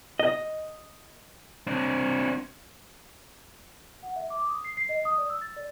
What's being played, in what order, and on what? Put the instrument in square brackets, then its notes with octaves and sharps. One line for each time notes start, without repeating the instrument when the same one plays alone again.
[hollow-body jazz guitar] D#5
[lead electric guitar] C4 D4
[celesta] F#5
E5
D6
D#6
C7
C7
D#5
D#6
D5
E6
A6
D5